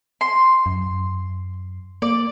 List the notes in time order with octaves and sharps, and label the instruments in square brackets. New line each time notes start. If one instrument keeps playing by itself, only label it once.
[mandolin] C6
[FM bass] F#2
[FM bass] A#3 [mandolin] D5